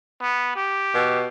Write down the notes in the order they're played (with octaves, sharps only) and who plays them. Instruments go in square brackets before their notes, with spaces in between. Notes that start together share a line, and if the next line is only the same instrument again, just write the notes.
[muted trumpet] B3
G4
[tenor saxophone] B2